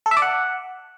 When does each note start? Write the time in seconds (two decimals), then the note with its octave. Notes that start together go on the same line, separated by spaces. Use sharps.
0.06 A4
0.11 E5
0.17 D5
0.22 F#5